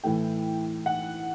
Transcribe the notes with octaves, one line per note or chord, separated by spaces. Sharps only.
A2 E3 A3 G5
F#5